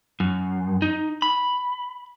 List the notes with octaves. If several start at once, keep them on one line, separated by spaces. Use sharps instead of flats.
F#2
D#4
B5